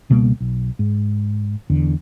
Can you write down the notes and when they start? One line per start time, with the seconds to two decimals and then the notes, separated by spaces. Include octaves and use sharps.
0.10 C#2 B2 G3 A#3
0.40 B1
0.79 G#2
1.70 E2 D3